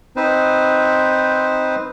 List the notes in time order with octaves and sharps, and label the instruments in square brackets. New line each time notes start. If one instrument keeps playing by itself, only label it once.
[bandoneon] C4 D#4 B4 C5